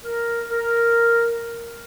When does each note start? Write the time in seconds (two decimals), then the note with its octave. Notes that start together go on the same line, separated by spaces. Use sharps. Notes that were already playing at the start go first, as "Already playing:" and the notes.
0.04 A#4
0.50 A#4